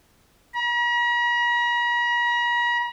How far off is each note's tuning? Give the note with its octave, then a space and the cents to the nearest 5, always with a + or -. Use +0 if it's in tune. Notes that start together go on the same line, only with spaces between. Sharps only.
A#5 +45